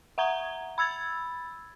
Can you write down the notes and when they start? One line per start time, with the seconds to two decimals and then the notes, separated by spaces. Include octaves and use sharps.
0.18 E5 F#5 A#5 G#6 G7
0.78 B5 E6 G#6 A6